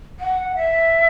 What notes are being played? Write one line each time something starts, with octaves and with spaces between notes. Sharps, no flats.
F#5
E5